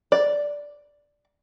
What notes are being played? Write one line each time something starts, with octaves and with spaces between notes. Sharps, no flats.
D5